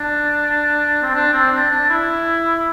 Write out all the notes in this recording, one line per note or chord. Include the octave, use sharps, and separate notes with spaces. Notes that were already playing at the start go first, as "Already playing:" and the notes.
Already playing: D4
C4
D4
C4
D4
D4
E4